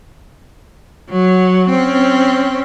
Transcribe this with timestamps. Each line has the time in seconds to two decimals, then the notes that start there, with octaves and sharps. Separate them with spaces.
1.10 F#3
1.70 C4 C#4